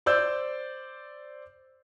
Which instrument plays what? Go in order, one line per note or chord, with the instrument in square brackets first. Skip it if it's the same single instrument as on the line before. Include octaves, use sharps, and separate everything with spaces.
[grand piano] C5 D5 E6 G6